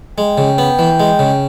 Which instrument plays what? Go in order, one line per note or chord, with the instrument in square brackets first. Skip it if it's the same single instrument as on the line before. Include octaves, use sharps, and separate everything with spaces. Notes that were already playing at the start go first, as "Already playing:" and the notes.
[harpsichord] G#3 [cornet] G5
[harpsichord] C#3
B3
E3
G#3
C#3